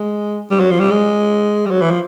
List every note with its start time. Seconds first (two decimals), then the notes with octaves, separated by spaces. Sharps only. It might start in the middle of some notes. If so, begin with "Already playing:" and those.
Already playing: G#3
0.51 G3
0.60 F#3
0.71 F3
0.80 G3
0.91 G#3
1.66 G3
1.71 F#3
1.81 E3
1.91 F3